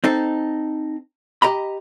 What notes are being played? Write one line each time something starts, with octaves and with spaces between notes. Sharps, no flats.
C4 D#4 A4
G4 D#5 A#5 B5